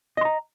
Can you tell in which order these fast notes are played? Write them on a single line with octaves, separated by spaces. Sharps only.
D#5 C6 A#5